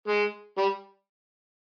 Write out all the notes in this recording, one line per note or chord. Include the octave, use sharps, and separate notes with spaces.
G#3
G3